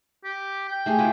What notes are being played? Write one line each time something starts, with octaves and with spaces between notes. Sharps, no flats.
G4
G5
A3 G4 G#4
E4 F4 B4